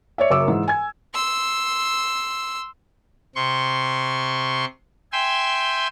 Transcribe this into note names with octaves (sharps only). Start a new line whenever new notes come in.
C#5 D5 E5
F#1 F#2 C#5 E5 D6 E6
G#2 E3
G#5 G#6
C6 E6
C3 C6 C#6
E5 G5 G#5 C6 E6